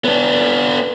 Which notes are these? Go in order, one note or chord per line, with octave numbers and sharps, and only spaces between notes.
B3 D4